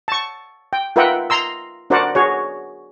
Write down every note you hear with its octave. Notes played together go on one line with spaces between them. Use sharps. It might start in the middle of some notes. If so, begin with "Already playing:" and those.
A5 C#6
G5
F4 A#4 B4 E5 F#5 G5
A#5 C6 E6
D4 F#4 A#4 C5 D5 F#5
F#4 G#4 C#5